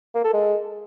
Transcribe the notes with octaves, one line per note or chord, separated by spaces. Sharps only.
A#3
A4
G#3